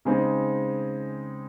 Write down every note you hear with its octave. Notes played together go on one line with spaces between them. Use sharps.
C#3 G#3 C4 D#4